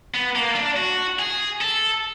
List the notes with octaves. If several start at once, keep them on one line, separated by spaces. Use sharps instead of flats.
B3
A#3
D4
F#4
G#4
A4